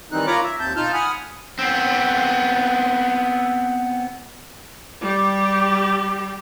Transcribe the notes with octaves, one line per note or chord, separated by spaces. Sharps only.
D#3 E3 G3 C4 D#4 F#6
F4 A#4 C#5 A#5 B5 D6
E5
D#2 C4 A5 G6
B2 D#4 F4 A5 F6 G6
F#5 G#5 B5 D#6 F6
B3 C4
G3 G4